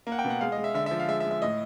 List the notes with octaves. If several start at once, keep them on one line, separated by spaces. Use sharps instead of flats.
A#3
F#5
G5
B2
F#5
G#3 F5
D#5
G#3
E5
D3 E5
F3 E5
F5
G#3 E5
E5
G#3
E5
A2 D#5